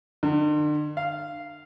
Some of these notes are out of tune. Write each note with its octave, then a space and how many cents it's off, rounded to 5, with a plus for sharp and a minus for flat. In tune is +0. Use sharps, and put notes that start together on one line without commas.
D3 +40
F5 -15